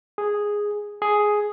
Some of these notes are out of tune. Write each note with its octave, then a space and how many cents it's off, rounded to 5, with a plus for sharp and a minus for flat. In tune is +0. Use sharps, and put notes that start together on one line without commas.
G#4 -5
G#4 +5